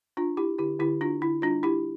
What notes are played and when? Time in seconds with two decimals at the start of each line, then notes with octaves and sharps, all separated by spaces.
0.17 D4 F4
0.37 D4 E4 G4
0.58 D3 E4 G4
0.80 D3 E4 G4
1.01 D4 F4
1.21 D3 E4
1.42 G3 D4 F4
1.63 D4 E4 G4